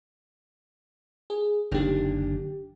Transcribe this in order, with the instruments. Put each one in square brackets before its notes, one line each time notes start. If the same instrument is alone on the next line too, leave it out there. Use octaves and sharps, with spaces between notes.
[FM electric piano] G#4
[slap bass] F#1 D4 [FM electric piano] D3 D#3 G4